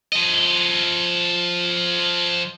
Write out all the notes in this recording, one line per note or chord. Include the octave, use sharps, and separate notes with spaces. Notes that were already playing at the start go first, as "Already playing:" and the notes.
F3 D#5